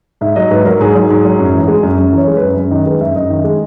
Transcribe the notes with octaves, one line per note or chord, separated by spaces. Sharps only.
G#2 E5
F#3 D#5
G#2 B4
F#3 A#4
G#2 G#4
F#3
G#2
F#3
F#2
E3
G#3
F#2
F#2
E3 C#5
G#3
B4
F#2
F#2
D#3 D#5
G#3 B4
F#2 E5
F#2 D#5
D#3
G#3